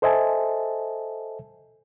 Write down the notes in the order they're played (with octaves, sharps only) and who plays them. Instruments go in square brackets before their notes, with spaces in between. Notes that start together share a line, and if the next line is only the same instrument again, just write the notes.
[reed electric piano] A4 C5 D#5 E5 G#5 A5